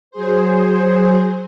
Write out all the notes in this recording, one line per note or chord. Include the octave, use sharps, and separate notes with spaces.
F#3 G#4 C5